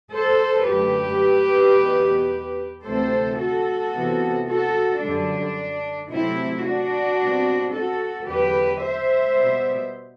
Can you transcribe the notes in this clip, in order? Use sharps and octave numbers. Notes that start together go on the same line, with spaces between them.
A4 C5
F#2 D3 A3 G4 B4
E2 B2 G3 B3
D2 C3 E3 A3 C4 A4 C5
F#4 A4
C3 E3 B3
F#4 A4
F#2 D3 G3 D4
C3 F#3 A3 C4 E4
D4 F#4
B2 G3 C4
F#4 A4
E2 D3 F#3 G4 B4
C5 E5
B2 G3 B3